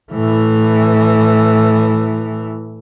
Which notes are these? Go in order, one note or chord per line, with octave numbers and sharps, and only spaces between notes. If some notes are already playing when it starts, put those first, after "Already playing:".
A2 E3